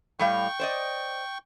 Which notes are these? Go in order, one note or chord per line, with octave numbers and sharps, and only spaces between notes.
A2 G3 F5 G5 C#6
C5 D5 D#5